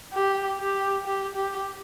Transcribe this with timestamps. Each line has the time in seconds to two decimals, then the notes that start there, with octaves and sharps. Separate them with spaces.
0.13 G4
0.58 G4
1.05 G4
1.35 G4